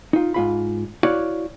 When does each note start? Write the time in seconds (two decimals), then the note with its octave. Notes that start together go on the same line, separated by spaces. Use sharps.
0.13 D#4 F4
0.34 G#2 F4 B5
1.03 E4 F#4 C#5 D5 F5